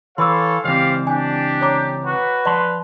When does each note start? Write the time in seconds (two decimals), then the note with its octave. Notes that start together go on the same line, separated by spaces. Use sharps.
0.18 E3 A4 B4 C#5 F5 C6 E6
0.64 C#2 E3 C4 G4 C5 D5 F5
1.07 D4 G4 G#5
1.61 C#5 A#5 D6
2.05 F#4 B4
2.45 F3 D5 A5 C6